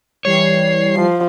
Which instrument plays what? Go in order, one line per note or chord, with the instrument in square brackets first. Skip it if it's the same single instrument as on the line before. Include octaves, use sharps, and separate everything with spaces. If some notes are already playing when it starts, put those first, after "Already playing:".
[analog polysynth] E3 G3 C7 [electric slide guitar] C#5
[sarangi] F3